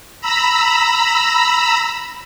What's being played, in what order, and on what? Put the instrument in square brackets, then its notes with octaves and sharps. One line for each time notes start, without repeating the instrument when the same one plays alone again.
[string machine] A#5 B5 E6